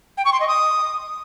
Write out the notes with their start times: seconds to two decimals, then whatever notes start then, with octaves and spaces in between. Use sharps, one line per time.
0.18 G5
0.25 C#6
0.33 C6
0.40 D#5
0.48 D#6